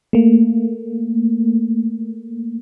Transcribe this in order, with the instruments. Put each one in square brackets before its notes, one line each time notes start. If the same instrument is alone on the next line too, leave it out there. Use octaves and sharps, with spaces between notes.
[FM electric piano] A3 A#3